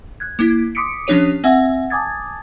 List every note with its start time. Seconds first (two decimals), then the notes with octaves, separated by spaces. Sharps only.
0.20 F#6 G#6
0.39 A#3 E4 B6
0.75 C6 D6 D#6 B6 C#7 D7
1.07 F3 C#4 D4 G4 C#5 D#7
1.44 C4 E5 F#5 G#5 E6
1.90 G#5 A5 D6 D#6 G#6 A6